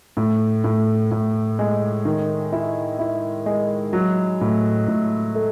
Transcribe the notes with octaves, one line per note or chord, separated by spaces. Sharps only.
A2
A2
A2
G#3
D#3
E4
E4
G#3
F#3
A2
A2
A3